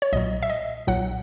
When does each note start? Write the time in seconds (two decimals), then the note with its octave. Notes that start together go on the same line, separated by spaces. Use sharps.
0.02 C#5
0.13 B1 A#2 F#3 D#5
0.43 E5
0.50 D#5
0.87 B1 A#2 F#3 F#5